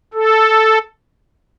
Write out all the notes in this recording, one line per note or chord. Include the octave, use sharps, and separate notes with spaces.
A4